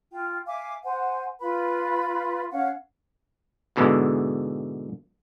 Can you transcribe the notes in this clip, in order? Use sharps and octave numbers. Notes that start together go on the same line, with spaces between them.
F4 G5
E5 F5 G#5 D6
C5 F#5 G#5
F4 B4 B5
C#4 C#5 F5 F#5
G#2 B2 D3 E3 G#3